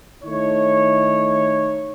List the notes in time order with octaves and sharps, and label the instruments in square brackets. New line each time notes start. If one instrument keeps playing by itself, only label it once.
[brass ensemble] D#3 A3 D#4 E4 C#5